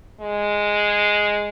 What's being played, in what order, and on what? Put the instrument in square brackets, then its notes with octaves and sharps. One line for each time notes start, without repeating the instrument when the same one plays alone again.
[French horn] G#3